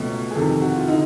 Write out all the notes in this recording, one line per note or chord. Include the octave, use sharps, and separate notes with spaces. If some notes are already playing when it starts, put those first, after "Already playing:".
Already playing: C#2 B2 F#3 A3
G#4
F2 C3 D#3 A4
F#4
F4
D3 D#4